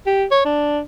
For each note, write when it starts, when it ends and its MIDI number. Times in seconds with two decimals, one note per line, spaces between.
0.06 0.25 67
0.31 0.41 73
0.45 0.81 62